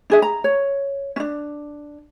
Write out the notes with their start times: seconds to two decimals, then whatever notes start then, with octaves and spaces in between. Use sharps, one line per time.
0.10 D4 G#4 E5
0.22 A#5
0.44 C#5
1.16 C#4 D4